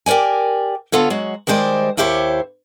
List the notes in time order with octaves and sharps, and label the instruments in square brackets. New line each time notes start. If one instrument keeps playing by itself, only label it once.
[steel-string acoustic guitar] G4 A#4 C#5 D5 G#5
D3 B3 F4 A4 C#5
F#3 G#3 F#4
D#3 G3 G#3 C5 D5
D#2 E4 G4 C5 C#5